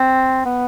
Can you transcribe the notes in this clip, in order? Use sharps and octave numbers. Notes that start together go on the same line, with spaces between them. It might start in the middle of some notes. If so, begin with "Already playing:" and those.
Already playing: C4
B3